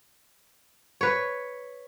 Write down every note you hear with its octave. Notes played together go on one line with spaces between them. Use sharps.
B4 C#5